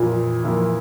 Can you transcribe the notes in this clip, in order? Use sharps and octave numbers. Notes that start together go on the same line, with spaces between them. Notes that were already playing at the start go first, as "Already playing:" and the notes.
Already playing: F2 A#2 E3 A#3 E4
F2 E3 A#3 E4